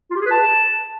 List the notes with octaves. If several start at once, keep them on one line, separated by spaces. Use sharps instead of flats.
F4
G4
G#4
B4
A5